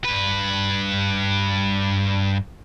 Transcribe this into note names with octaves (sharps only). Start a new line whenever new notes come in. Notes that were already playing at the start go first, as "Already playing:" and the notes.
G2 B4